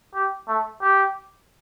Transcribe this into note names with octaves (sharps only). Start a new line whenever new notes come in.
G4
A3
G4